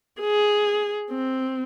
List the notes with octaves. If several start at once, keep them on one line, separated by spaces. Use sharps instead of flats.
G#4
C4